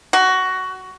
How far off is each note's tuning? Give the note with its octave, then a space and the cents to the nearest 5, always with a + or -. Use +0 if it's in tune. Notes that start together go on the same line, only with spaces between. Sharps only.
F#4 +15